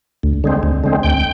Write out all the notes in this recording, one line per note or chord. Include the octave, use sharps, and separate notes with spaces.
D2
D3 G#3 C4
D2
D3 G#3 C4
D2 G5